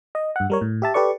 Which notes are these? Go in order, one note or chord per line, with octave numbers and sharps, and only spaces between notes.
D#5
G2 F#5
G3 A#4 C#5
A2
G4 E5 A5
G4 A4 B4 D5 C#6